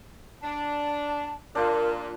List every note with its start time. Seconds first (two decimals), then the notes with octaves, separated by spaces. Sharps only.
0.42 D4 A5
1.55 A#2 D4 F4 A#4 F5